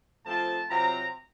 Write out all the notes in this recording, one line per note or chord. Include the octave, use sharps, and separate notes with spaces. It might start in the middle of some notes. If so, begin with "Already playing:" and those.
F3 A3 C4 F4 A5
C3 F#3 C4 F4 A#5